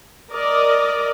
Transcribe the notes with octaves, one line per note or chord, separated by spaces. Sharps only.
A#4 D5 D#5